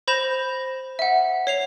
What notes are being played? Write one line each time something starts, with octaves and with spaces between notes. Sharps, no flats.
C5 B5 G6 A#6 E7 F7
E5 F#5
C#5 C7 F7